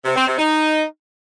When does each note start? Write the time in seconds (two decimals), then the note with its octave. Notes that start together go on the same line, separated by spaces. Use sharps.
0.05 C3
0.16 C4
0.27 C3
0.38 D#4